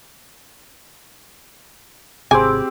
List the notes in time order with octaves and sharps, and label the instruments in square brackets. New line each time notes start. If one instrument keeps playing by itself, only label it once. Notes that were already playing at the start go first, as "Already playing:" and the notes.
[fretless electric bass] G#1 C3 [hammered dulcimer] C4 G4 D6 [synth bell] G#4 [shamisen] G#5